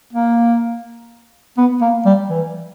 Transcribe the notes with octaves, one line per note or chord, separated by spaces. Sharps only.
A#3
B3
A#3
G3
E3